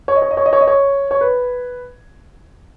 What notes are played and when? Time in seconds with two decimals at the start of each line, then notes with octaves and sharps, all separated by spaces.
0.08 C#5
0.15 D#5
0.22 C#5
0.31 D#5
0.37 C#5
0.46 D#5
0.53 C#5
0.61 D#5
0.67 C#5
1.11 C#5
1.21 B4